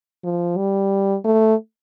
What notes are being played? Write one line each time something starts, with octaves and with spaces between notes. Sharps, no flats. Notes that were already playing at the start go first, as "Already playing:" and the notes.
F3
G3
A3